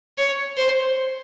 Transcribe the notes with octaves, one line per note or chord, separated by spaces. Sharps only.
C#5
C5